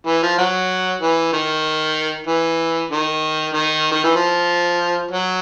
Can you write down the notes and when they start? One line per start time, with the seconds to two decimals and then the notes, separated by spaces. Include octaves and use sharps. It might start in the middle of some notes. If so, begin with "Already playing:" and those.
0.07 E3
0.23 F3
0.38 F#3
1.01 E3
1.33 D#3
2.27 E3
2.91 D#3
3.54 D#3
3.92 D#3
4.04 E3
4.16 F3
5.11 F#3